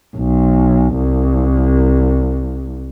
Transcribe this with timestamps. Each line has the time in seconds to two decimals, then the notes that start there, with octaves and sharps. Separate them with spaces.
0.16 B1
0.98 C2